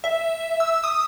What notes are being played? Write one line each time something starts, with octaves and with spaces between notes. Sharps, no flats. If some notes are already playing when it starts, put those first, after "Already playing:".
E5
E6
D#6